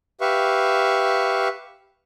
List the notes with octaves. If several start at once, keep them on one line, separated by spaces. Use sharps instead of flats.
G4 B4 E5 F5 C#6